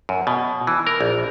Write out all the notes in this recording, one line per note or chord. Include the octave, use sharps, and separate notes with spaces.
F#2
B2
E3
A#4
A#1